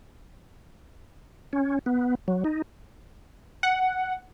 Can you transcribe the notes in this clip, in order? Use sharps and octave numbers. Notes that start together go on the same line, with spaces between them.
C#4
B3
F#3
D#4
F#5